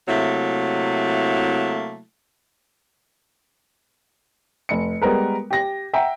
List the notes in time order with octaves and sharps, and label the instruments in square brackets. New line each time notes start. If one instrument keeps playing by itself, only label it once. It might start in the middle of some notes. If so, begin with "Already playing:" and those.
[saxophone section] C3 F#3 A3 A#3 E4
[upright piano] F1 C#7
G3 G#3 B3 A#4 B4
G4 A#6
E5 F#5 G5 A#5